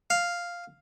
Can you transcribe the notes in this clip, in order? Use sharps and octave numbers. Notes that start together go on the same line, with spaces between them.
F5